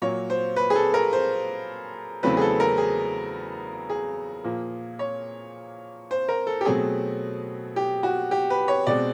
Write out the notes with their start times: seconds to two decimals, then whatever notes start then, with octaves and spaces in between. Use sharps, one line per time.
0.02 A#2 F#3 A#3 C#5
0.30 C5
0.56 B4
0.70 G#4
0.76 A4
0.94 A#4
1.13 C5
2.23 E2 C#3 F#3 A3 C4 B4
2.37 G#4
2.41 A4
2.60 A#4
2.78 G#4
3.90 G#4
4.44 A#2 F3 A#3
4.99 C#5
6.11 C5
6.29 A#4
6.47 A4
6.61 G4
6.65 B2 F#3 A3 C4 G#4
7.76 G4
8.03 F#4
8.31 G4
8.50 B4
8.68 C#5
8.87 B2 G#3 C4 D5